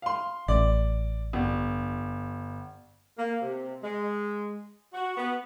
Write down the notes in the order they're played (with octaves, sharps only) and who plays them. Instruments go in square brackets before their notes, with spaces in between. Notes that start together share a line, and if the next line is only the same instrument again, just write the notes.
[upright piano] F5 C6
[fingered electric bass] A1 [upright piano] D5
[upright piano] G1
[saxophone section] A#3
C3
G#3
F#4
B3